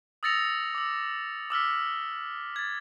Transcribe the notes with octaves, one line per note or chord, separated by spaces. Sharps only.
D#6 E6 A6 A#6 C#7 F7
D6 E6
D6 E6 F6 B6
G#6 A6